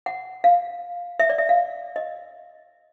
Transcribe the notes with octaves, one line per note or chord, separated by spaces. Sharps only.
F#5
F5
E5
D5
E5
F5
D#5